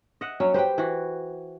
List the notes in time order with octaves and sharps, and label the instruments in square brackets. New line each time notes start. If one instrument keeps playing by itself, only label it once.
[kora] D#5 E5 F#5
[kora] F#3 [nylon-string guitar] C#4
[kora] G4 B4 [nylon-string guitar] C5 G5
[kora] E3 F#4